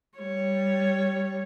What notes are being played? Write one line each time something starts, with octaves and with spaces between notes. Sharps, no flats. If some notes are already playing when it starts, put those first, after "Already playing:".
G3 C#5